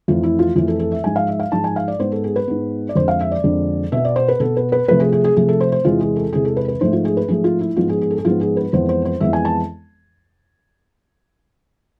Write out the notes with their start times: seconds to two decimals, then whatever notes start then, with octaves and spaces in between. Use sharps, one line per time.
0.08 F2 E3 A3 F4
0.23 E4
0.39 F4
0.56 F2 E3 A3 F4
0.68 A4
0.79 A4
0.92 E5
1.03 G#2 F3 G#3 G#5
1.16 F5
1.28 E5
1.39 F5
1.52 G#2 F3 G#3 A5
1.64 G#5
1.76 F5
1.88 D5
1.99 G#2 G#3 B3 C5
2.12 A4
2.24 G#4
2.36 B4
2.48 G#2 G#3 B3
2.89 D5
2.95 F2 D3 G#3 C5
3.08 F5
3.21 E5
3.32 D5
3.44 F2 D3 G#3
3.92 B2 B3 E5
4.05 D5
4.16 C5
4.28 B4
4.40 B2 B3 A4
4.57 B4
4.72 B4
4.88 C3 F3 A3 B4
5.00 G#4
5.12 G#4
5.24 G#4
5.36 C3 F3 A3 G#4
5.49 A4
5.61 C5
5.72 C5
5.85 E2 C3 E3 G#3 F4
6.01 G#4
6.16 A4
6.33 E2 C3 E3 G#3 G#4
6.45 A4
6.57 B4
6.68 B4
6.81 G#2 F3 A3 C5
6.93 F4
7.05 G#4
7.17 B4
7.28 G#2 F3 A3 G#4
7.44 F4
7.61 E4
7.77 G#2 F3 G#3 B3 F4
7.89 G#4
8.01 G#4
8.10 A4
8.18 G#4
8.25 G#2 F3 G#3 B3 F4
8.41 G#4
8.57 B4
8.73 F2 E3 G#3 B3 C5
8.89 C5
9.05 C5
9.21 F2 E3 G#3 B3 E5
9.33 G#5
9.45 A5